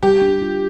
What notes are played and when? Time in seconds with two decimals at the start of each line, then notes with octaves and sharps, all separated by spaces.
0.03 G3 G4
0.22 D4
0.42 F4